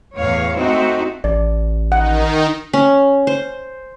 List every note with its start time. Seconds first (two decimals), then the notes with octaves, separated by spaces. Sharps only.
0.17 E2 A2 C#5 F5
0.56 A3 C4 D#4 F#4
1.24 A1 D5
1.92 D#3 D#4 F#5
2.73 C#4
3.27 C5